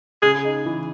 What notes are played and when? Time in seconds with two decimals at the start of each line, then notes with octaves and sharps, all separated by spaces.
0.22 C#3 G#4
0.44 D#4
0.65 E3